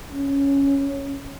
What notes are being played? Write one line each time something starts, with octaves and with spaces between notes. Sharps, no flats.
C#4